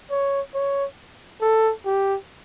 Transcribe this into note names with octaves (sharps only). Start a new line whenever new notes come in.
C#5
C#5
A4
G4